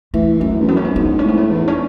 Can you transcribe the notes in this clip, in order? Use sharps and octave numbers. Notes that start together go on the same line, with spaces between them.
E3 A3
F#2 A3
E2
F#2 B3
C#4
B3
F#2
G#2 B3
C#4
A2 B3
A3
E2
C#4